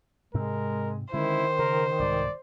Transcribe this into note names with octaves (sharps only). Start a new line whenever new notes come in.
G#2 C3 G#3 C4 A#4
D3 D#3 G#3 C#4 E4 C5
C#3 A#4
C2 G#2 C3 D5